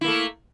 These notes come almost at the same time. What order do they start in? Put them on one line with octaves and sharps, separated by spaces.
E4 A#3 A3